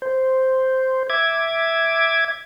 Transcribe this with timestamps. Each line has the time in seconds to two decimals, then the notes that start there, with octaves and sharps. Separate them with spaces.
0.02 C5
1.10 E5 D6 G#6